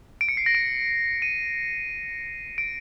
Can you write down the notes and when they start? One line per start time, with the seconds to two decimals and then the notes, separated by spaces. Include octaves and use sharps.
0.21 D7
0.28 C#7
0.37 C7
0.46 A#6
0.55 D7
1.22 D#7
2.58 D7